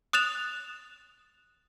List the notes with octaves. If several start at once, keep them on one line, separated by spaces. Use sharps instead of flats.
D#6 F#6 A6 E7 F7